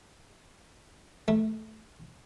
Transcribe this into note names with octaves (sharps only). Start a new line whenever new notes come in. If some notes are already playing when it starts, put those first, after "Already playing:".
A3